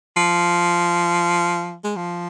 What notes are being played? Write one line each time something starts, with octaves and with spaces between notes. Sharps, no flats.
F3
G#3
F3